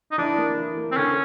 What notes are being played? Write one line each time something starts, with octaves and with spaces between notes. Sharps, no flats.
D#4
E3 D4
A#3
E3
A#3
C4
D3 C#4